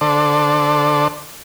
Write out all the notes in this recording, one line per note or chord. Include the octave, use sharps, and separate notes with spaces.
D3 A4 C5 D5